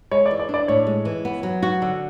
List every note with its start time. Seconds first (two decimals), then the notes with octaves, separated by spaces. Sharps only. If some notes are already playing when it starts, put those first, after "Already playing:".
0.11 G#3 C#5
0.26 D5
0.31 E3
0.40 D5
0.49 D4
0.54 D5
0.68 A2 C#5
0.87 G#3
1.05 E3
1.25 B3
1.43 F#3
1.63 F#4
1.82 D3